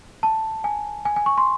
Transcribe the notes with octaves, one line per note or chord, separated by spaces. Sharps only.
A5
G#5
G#5
G#5
C#6
C6